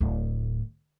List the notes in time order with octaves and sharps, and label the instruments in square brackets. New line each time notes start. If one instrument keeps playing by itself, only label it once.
[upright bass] D1 A2